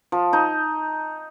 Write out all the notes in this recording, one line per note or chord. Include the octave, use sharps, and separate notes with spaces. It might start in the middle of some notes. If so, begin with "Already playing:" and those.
F3
D#4